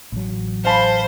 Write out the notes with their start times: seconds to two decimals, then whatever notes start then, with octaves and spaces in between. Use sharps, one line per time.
0.12 A1 F#3
0.65 C5 F5 A5 B5